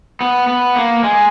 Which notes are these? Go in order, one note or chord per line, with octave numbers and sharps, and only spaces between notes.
B3
B3
A#3
G#3